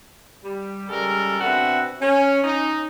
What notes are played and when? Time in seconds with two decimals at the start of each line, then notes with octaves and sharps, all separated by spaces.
0.44 G3
0.89 C#3 G3 G#3 A4 A#4
1.41 B2 C4 D4 F#4 B4 E5
2.01 C#4
2.44 C#4 D#4